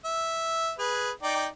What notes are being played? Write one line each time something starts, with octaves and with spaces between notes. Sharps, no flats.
E5
G#4 B4
D#4 D5 G5